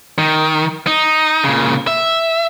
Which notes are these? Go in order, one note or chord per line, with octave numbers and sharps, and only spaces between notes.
D#3
D#4
A#2 C#3
E5